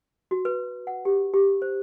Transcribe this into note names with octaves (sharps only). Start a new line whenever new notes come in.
F#4
B4
F#5
G4
G4
C5